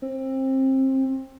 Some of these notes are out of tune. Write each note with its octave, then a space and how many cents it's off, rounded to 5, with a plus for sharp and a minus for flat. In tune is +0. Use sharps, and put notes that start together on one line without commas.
C4 +25